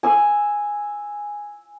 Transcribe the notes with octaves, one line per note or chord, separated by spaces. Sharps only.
G#5 E6